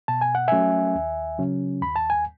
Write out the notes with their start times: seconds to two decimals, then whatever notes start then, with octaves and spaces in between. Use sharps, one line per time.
0.08 B2 A5
0.21 G#5
0.35 F#5
0.48 F#3 A3 C#4 E5 G#5
0.95 D#2
1.38 C#3 F#3 C#4
1.82 D#2 B5
1.96 A5
2.10 G#5